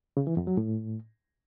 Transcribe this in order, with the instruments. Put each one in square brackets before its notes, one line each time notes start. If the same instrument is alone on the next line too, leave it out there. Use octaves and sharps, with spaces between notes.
[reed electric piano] C#3
E3
F2
F#3
A2